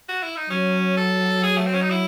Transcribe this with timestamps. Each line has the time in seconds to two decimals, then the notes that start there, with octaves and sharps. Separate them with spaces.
0.09 F#4
0.23 E4
0.36 D#4
0.50 F#3 C#4
0.97 A4
1.43 G#4
1.57 A3
1.66 C4
1.73 C#4
1.82 D#4
1.90 E4